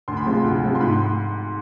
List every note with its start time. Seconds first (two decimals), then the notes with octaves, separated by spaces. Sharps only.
0.08 D2 C6
0.17 B5
0.26 C3 F3 G#3 C6
0.44 D2
0.62 C3 F3 G#3
0.75 C6
0.81 G#2 B5
0.93 C6